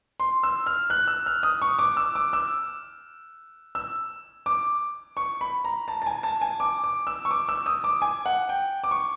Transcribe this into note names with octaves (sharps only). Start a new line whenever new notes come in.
C6
E6
F6
F#6
E6
F6
D#6
C#6
D6
E6
D6
E6
E6
D6
C#6
B5
A#5
A5
A5
G#5
A5
G#5
D6
D6
E6
C#6
D6
E6
D#6
D6
G#5
F#5
G5
D6
C#6